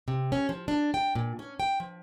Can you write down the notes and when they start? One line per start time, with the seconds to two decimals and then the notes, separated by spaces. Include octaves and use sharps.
0.08 C3
0.32 C#4
0.49 F3
0.68 D4
0.94 G5
1.15 A#2
1.39 C#4
1.60 G5
1.80 F3